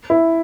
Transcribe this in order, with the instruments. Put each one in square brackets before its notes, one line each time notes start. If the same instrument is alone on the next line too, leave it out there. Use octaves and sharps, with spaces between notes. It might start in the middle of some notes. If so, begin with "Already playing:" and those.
[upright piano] E4